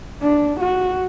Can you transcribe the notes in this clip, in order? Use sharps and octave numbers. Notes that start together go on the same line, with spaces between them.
D4
F#4